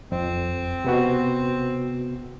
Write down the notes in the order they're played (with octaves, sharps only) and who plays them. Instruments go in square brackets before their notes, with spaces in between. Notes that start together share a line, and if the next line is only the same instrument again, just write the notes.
[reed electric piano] F2 [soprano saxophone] C4
[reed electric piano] C3 B3 F#4